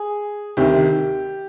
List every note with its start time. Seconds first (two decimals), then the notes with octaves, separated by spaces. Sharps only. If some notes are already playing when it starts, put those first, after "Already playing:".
Already playing: G#4
0.57 D2 C3 D#3 G4